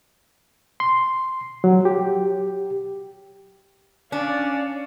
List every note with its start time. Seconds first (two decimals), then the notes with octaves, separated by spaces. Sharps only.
0.80 C6
1.64 F#3
1.85 G4
4.12 C#4 D4 D5 F5